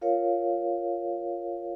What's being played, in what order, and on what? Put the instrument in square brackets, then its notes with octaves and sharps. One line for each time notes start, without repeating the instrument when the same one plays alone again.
[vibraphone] F4 A#4 C#5 F5